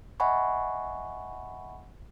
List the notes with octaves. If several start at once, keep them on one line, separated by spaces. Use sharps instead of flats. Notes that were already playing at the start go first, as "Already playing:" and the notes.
D#5 E5 F#5 G#5 B5 C#6